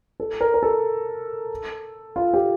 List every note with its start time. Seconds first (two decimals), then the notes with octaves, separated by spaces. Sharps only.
0.20 A4
0.41 A#4
0.54 A#4
0.63 A4
2.16 F4
2.34 G4